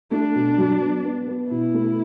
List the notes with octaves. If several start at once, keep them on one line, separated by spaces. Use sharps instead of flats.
A3 D4
B2
F#3
B3
B3
B3
B2 E4
A3